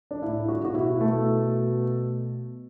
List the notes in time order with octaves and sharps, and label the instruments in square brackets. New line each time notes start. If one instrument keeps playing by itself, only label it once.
[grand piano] D4
[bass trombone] A2 [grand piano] E4
[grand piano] F#4
[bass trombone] B2 [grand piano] F#4
[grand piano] E4
A3